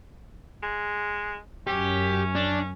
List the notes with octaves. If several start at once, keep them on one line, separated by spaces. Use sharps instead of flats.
G#3
F#2 C#4 G4
D4